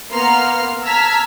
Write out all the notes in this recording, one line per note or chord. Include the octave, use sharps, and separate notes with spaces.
A#3 B3 A#5 C6 F6 C7
A5 A#5 E6 F6 G#6 B6